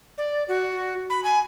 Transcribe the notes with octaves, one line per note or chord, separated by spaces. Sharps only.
D5
F#4
B5
G#5